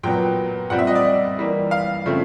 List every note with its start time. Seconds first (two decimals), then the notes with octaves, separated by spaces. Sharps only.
0.03 A#2 F#3 B3 G5
0.70 A#2 G3 C4 F4 F#5
0.79 E5
0.87 D#5
0.95 D5
1.39 E3 G3 A#3
1.71 F5
2.05 C#3 F3 A3 C4